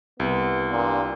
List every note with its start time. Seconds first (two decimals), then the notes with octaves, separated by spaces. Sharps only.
0.20 C2 B3
0.70 G2 A#2